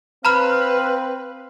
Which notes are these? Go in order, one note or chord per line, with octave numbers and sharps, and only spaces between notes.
C4 B4 F5 A#5 B5 F6